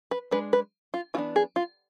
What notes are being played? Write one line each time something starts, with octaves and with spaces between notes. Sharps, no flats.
B4
G#3 D4 B4
B4
F4
E3 B3 D4 F4
G#4
F4